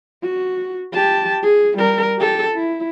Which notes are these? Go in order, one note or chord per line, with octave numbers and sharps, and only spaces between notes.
F#4
G4 A5
G#4
G3 A#4
G4 A4
E4